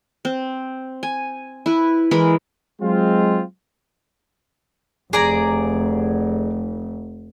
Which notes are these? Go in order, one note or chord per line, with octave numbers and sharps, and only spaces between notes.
C4
G#5
E4 B4
E3 G#3 A#4 B5
F#3 G#3 C4 F4
F1 G#4 D5 A#5